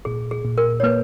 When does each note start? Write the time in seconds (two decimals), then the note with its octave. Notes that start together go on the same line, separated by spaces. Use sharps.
0.05 A#2 G#4
0.31 G#4
0.45 A#2
0.58 A#4
0.80 C#5
0.83 A#3 B4